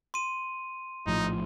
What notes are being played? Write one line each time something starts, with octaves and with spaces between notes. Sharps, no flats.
C6 D#7
A#1 A2 F3 D#4